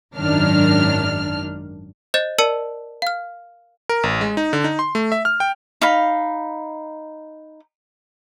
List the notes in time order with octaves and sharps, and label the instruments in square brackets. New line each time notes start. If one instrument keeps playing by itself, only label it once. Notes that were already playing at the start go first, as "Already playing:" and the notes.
[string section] G#1 F#2 D#3 D4 F6
[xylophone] C5 D#5 G6 A6 E7
A#4 D5 A5 E6 C#7 D#7
F5 F6
[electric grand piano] A#4
A1
G#3
D#4
D3
D#4
C6
A3
E5
F6
G5
[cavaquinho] D#4 F5 B5